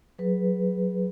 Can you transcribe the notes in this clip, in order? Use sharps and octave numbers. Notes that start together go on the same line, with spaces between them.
F#3 G#4 B4